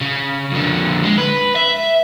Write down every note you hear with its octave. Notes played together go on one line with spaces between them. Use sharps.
C#3
F2 D3
G#3
B4
E5